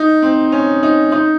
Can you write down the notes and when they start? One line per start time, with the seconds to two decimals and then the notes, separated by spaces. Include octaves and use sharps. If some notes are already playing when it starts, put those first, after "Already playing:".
Already playing: D#4
0.22 C4
0.52 C#4
0.83 D#4
1.12 D#4